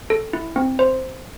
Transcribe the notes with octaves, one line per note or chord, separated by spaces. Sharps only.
A4
E4
C4
C5